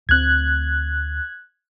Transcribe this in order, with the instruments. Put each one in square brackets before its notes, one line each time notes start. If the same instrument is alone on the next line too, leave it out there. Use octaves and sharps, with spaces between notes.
[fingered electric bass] D2 C4 [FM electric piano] F#6 G#6